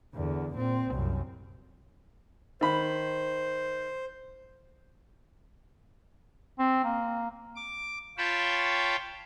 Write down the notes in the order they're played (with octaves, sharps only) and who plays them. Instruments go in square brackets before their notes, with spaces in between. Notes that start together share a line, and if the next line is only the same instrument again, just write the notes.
[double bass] E2 D3
A#2 C4
C2 F#2
[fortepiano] D#3 B5 [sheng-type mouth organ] C5
[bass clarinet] C4
A#3
[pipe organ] D6
F4 C#5 G5 A5 B5